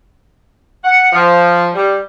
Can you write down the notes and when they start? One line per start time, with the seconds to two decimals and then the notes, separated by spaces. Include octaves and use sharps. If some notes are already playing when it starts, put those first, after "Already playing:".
0.84 F#5
1.12 F3
1.74 G3